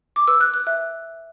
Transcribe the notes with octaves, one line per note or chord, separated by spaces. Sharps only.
D6
B4 E6
F#6
B4
F#6
E5 F#6